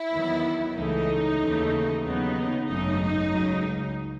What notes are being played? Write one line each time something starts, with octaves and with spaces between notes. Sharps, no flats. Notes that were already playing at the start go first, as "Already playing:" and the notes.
Already playing: E4
E2 D#3 F#3 B3
C#2 C#3 E3 A3 D#4
D#2 C#3 E3 A3
D#2 C#3 F#3 B3 D#4
G#1 F#2 C#3 F#3 A3 D#4
C#2 C#3 F#3